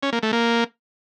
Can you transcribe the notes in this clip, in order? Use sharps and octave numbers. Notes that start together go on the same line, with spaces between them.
C#4
A#3
A3
A#3